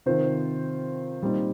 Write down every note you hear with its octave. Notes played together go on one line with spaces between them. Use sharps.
C3 D#3 C4 F4 C5
A#2 G3 C4 D#4